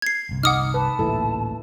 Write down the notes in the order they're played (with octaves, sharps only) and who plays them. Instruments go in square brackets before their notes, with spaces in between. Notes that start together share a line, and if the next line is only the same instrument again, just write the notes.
[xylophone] G#6 C7
[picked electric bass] G1 C2
[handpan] D#4 [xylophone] F#5 D#6 F6 [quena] D6
[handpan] B4 [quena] A5
[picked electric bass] A1 D2 A#2 [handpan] E4 A4